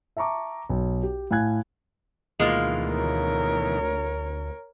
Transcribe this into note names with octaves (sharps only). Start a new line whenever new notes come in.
E5 A5 A#5 C#6 D6
B1
G4
A2 F5 G#5 F#6 G#6
D2 B2 D#3 E3 G#3 A#3 F4
A#4 C#5